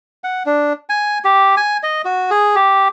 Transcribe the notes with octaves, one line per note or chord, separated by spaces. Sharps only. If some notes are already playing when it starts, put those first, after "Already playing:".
F#5
D4
G#5
G4
G#5
D#5
F#4
G#4
G4